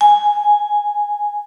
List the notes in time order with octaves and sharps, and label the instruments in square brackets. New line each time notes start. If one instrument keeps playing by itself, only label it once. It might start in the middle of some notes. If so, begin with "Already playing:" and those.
[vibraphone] G#5